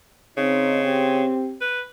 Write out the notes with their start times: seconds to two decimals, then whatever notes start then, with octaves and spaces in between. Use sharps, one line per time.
0.37 C#3 C4 D#4
0.84 C4 G4
1.61 B4